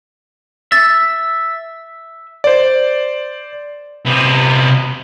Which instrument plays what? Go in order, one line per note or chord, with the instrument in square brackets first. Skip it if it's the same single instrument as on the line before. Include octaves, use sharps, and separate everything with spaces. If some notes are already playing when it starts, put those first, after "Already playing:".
[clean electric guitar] E5 [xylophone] A6
[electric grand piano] C5 D5
[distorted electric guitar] C3 B3